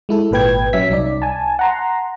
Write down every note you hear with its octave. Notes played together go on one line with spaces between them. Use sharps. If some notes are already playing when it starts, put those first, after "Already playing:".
G#3 E4 A4
G#1 A#2 B4 G5 G#6
F#3 C#4 E5 B6
C2 D#4 D5
G#5 A5
F#5 A#5 C6